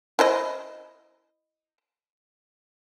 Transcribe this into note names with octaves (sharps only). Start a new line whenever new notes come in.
E4 C5 D#5